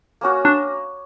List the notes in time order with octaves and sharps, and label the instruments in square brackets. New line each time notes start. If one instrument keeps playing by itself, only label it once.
[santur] A#3 C#4 F#4 A#4
[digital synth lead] D4